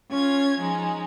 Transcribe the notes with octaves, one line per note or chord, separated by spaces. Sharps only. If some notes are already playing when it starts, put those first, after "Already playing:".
C#4 F4 G#6
F3 G#3 D#4